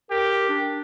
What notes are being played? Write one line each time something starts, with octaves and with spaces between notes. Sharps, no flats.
G4 A#4
D4